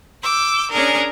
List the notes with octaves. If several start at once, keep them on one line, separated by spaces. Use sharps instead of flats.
D6 E6 G6
C#4 D4 G#4 A#4